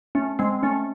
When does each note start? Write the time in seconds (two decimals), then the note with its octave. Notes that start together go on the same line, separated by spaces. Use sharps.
0.15 A3 C#4
0.39 G#3 C4
0.63 A3 C#4